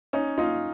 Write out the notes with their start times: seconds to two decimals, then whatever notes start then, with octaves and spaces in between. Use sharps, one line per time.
0.13 C#4 D#4
0.38 D#4 F4